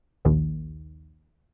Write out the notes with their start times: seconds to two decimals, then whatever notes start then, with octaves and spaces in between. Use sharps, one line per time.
0.25 A#1 D#2